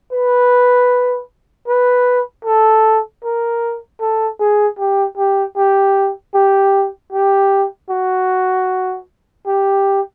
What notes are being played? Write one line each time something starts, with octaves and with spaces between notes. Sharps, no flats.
B4
B4
A4
A#4
A4
G#4
G4
G4
G4
G4
G4
F#4
G4